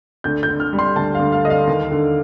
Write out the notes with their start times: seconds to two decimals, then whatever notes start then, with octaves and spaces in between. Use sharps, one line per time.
0.24 D2 G6
0.43 G6
0.49 D3
0.60 F6
0.73 G3
0.79 C6
0.96 D2 A5
1.15 D2 F5
1.32 F5
1.44 D3 D#5
1.50 F5
1.67 D#2
1.91 D3